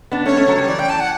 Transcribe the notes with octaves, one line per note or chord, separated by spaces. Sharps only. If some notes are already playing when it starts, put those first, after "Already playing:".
B3 D4
A3 C#4 C#5
A3 C#4
F#3 A3
G3
E3 D5
G5
A5
F#5